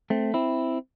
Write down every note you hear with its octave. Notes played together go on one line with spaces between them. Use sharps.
A3 C4
C4 E4